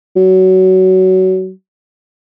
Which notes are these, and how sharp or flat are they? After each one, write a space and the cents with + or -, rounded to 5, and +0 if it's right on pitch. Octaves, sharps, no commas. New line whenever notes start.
F#3 +20